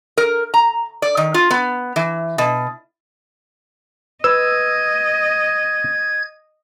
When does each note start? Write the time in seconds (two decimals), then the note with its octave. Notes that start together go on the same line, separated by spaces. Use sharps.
0.18 A#4
0.54 A#5
1.02 D5
1.17 D#3
1.34 F4
1.51 B3
1.96 E3
2.38 B2
4.24 B4 D#5 E6 G#6